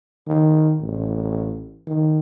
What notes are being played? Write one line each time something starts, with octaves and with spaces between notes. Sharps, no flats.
D#3
A1
D#3